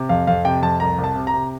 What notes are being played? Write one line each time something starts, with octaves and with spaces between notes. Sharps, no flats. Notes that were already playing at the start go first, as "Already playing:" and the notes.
Already playing: C3
F2 F5
F2 F5
C3 G5
F2 A5
C2 A#5
C2
A5
C3
A#5
C3